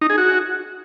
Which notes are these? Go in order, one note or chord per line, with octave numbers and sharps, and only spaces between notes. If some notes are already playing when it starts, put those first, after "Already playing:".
D#4
G#4
F#4